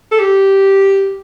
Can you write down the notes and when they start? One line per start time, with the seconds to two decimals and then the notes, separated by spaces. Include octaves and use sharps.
0.11 A4
0.20 G4